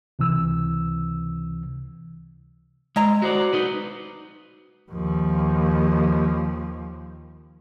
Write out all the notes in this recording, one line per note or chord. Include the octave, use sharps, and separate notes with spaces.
C#2 C3 E3 E6
G#3 E4 D#5 A#5
F#4 C5 D5
D#4 F#4 B4
D#2 F3